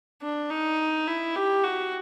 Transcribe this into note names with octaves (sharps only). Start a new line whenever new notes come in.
D4
D#4
E4
G4
F#4